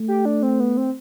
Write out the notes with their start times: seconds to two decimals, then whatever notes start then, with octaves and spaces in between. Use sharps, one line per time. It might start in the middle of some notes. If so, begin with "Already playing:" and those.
Already playing: A3
0.08 G4
0.25 D4
0.43 C4
0.60 B3
0.77 C4